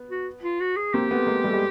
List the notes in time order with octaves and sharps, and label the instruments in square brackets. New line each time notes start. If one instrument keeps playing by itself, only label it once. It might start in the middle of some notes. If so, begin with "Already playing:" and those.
Already playing: [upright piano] B3
[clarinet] F#4
F4
F#4
G#4
[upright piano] A#3 C4 [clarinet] G4
[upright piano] A3 B3
G#3 A#3
G3 A3
G#3